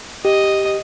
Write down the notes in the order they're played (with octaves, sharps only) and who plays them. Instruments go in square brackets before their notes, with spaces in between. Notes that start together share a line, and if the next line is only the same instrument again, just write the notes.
[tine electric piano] G4 [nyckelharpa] D#5